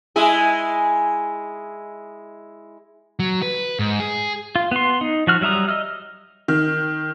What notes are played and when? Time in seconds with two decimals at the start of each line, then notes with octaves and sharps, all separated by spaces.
0.16 G#3 E4 G#4
3.19 F#3
3.42 B4
3.79 G#2
4.00 G#4
4.56 F4
4.71 B3 C6
5.01 D#4
5.27 F3 F#4 F6
5.41 F#3 G3 E5 A#5 D#6
5.69 D#5 E6 F6
6.48 D#3